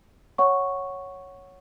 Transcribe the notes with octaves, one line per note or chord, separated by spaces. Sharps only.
C#5 F#5 C#6